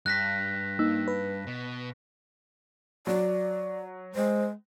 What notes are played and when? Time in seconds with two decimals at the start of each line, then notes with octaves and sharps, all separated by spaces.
0.06 G2 F#6 A#6 B6
0.79 A#3 D#4 E6
1.08 B4
1.47 B2
3.07 F#3 D5
4.15 G#3 C5